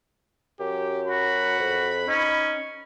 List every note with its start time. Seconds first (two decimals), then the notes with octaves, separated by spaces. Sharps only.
0.60 F#2 G4
1.08 F#4 B5
1.59 F2
2.08 C#4 D#4